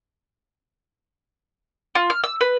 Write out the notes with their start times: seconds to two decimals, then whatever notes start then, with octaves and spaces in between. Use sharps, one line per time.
1.95 F4
2.10 F6
2.24 E6
2.41 B4